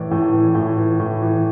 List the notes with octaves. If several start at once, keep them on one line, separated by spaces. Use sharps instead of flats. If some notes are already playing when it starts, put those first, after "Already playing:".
Already playing: A2 E3 D5
A2
E3
A2
E3
A2
E3